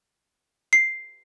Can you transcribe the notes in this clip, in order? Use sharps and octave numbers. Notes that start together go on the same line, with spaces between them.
C7